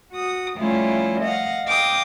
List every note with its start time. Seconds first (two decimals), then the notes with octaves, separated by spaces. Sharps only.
0.11 F#4 D#6
0.59 F3 G3 A3 C#4 E4 F4
1.21 D#5 F5 F#5
1.66 D#5 F5 G5 D6 D#6